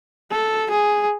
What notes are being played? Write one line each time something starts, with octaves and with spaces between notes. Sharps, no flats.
A4
G#4